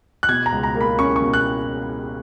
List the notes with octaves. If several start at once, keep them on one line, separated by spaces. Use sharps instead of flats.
F#6
B2 G#6
A#5
C#2
A#5
A#3
B5
C#4 C#6
C#6
B2
F#6